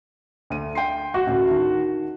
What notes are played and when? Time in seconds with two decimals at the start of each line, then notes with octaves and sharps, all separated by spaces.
0.50 D2 D#7
0.75 G5 C6 C7
1.14 F#4
1.26 A1 D2
1.48 D#3 A5